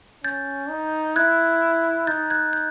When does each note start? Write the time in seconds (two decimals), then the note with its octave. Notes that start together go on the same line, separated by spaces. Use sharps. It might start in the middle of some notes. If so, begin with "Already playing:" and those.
0.24 C#4 G6 A6
0.70 D#4
1.16 E4 F#6 G#6
2.07 D#4 G6 A6
2.30 F#6 G#6
2.53 G6